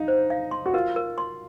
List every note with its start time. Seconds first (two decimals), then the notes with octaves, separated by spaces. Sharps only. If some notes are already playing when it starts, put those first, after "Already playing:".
Already playing: D#4 F5
0.08 C5
0.30 F5
0.51 C6
0.66 F#4
0.74 F4 A#4
0.96 A#4
1.18 C6